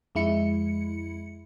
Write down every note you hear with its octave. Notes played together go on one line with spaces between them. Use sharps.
F2 G#3 E4 C#7